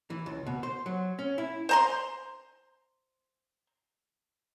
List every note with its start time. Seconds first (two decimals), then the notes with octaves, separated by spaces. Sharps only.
0.10 E3
0.26 C#2
0.46 B2
0.63 C5
0.86 F#3
1.19 C#4
1.38 E4
1.69 C5 A#5 C6